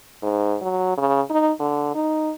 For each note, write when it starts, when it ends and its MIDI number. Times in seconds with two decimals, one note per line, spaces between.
0.23 0.57 44
0.62 0.94 54
0.98 1.21 49
1.30 1.51 63
1.60 1.94 50
1.95 2.33 63